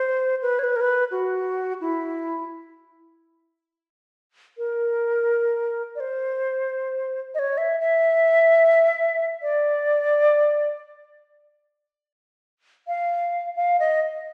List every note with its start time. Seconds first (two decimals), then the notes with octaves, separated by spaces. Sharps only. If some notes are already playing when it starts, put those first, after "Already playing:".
Already playing: C5
0.42 B4
0.59 C#5
0.64 B4
0.76 A#4
0.81 B4
1.11 F#4
1.81 E4
4.58 A#4
5.96 D5
6.00 C5
7.35 D#5
7.39 C#5
7.58 E5
7.80 E5
9.42 D5
12.88 F5
13.56 F5
13.80 D#5